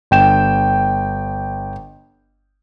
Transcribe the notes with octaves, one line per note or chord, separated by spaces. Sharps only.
G1 G5 E7